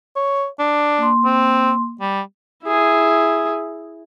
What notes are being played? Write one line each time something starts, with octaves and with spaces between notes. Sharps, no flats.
C#5
D4
A#3 C6
C4
G3
E4 G#4